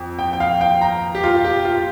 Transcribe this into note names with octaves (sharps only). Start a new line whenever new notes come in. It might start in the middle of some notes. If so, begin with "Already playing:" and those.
Already playing: F2
G5
G5
F5
G5
A#5
G4
F4
G4
F4